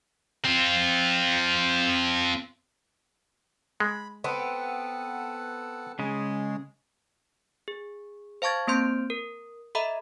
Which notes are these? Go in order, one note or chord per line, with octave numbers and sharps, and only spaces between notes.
C4 F4
G#3 B5
B3 C4 A4 F#5
C#3 G#3 G#4
G#4
C5 F5 A5 C#6 G#6 A6
A#3 C4 C5 C6 G6 D7
A#4
A4 D#5 E5 A#5 B5